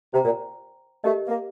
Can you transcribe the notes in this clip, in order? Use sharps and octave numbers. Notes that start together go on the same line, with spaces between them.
C3 C5 G5 A#5
A#2
A3 G4 A#4 D#5
A#3